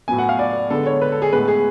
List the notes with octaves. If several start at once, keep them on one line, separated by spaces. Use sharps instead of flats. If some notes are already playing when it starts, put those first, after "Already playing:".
A2 F#3 B3 G#5
F#5
F5
D5
D3 G#3 B3 A4
C#5
B4
A4
G#4
A2 G#3 B3 B4
G#4